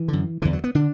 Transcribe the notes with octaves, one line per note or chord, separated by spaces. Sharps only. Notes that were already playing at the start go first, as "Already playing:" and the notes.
Already playing: E3
F#2 D3
E2 D3 E3
F#3
B3
D3 D4